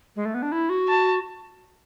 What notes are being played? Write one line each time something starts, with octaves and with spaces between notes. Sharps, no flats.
G#3
A3
B3
D4
E4
F#4
A5